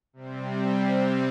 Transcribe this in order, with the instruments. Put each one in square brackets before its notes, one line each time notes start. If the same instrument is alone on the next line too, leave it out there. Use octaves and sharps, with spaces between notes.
[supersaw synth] C3 G3 C4